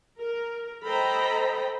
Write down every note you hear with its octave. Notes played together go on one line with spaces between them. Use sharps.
A#4
A4 C5 D#5 G5 A#5 B5